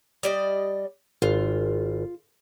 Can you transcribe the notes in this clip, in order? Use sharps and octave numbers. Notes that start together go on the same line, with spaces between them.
G3 D5 D#5
G#1 F4